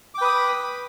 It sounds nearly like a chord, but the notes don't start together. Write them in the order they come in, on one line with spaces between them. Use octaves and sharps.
D6 G5 B4 D#6 B5